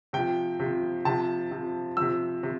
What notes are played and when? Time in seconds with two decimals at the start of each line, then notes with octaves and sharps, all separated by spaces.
0.13 C3 F3 G5
0.60 C3 F3
1.05 C3 F3 A5
1.51 C3 F3
1.97 C3 F3 E6
2.43 C3